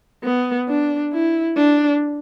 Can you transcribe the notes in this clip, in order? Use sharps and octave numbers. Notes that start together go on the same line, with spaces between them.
B3
D4
E4
D4